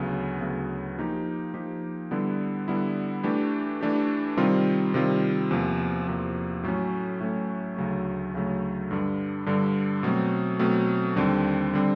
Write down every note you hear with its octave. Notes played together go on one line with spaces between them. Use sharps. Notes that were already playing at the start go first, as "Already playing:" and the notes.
Already playing: D2 C#3 F#3 B3
D2 C#3 F#3 B3
F3 A#3 D#4 G4
F3 A#3 D#4 G4
D3 G3 B3 E4
D3 G3 B3 E4
E3 A3 D4 G4
E3 A3 D4 G4
C3 D#3 G3 C4 F4
C3 D#3 G3 C4 F4
E2 C3 F3 A#3
E2 C3 F3 A#3
A2 F#3 A3 C#4
A2 F#3 A3 C#4
D2 C#3 F#3 A3
D2 C#3 F#3 A3
G2 D3 G3
G2 D3 G3
B2 F#3 A3 C4
B2 F#3 A3 C4
D#2 D3 G3 C4
D3 G3 C4